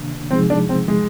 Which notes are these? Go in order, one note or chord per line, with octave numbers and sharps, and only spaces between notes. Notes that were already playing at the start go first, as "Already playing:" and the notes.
Already playing: C3 D#3 A#3 D4
C3 F3 G#3 C4 D#4 G#4
D4
C4
G#3